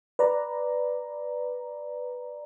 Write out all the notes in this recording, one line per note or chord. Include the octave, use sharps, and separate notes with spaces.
B4 D5 A#5